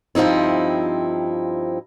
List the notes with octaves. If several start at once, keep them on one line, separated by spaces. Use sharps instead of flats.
G2 F3 C4 D#4 E4